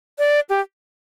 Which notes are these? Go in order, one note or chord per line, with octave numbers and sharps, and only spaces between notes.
D5
G4